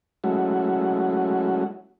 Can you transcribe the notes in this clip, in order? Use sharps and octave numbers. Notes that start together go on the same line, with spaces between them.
F#3 G#3 A3 C#4 E4 F#4